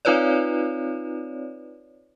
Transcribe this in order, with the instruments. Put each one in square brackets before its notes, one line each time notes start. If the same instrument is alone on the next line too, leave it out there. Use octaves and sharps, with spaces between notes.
[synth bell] C4 D#4 F4 B4 C#5 D5